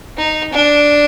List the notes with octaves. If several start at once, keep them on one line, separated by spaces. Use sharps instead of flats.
D#4
D4